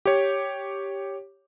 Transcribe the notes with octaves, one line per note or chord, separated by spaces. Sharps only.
G4 C#5